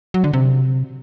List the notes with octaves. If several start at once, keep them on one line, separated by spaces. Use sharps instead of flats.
F#3
D3
C3